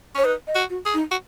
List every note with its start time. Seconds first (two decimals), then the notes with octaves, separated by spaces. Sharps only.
0.15 C#4 C#5
0.24 D#4 B4
0.48 D#5
0.55 F#4
0.70 F#4
0.85 G#4
0.94 D#4
1.11 F#4